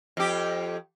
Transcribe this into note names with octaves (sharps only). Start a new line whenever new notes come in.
F2 G4